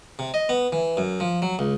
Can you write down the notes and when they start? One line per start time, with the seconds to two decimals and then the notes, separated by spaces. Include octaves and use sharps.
0.19 C3
0.34 D#5
0.49 B3
0.73 E3
0.97 F#2
1.20 F3
1.42 F#3
1.59 C#2